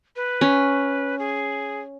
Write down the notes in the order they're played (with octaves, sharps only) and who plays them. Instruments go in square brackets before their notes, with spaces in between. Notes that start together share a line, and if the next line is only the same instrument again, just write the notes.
[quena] B4
[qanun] C#4
[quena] G#4